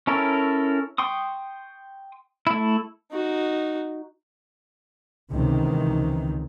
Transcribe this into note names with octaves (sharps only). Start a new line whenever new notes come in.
C#4 E4 A4 A#4 C#5
G5 C6 C#6 D#6
A3 E4
D#4 F#4
C#2 C3 D#3 E3